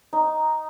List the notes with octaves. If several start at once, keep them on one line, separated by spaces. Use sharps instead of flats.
D#4